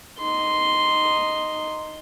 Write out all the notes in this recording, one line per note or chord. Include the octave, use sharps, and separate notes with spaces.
D#4 C6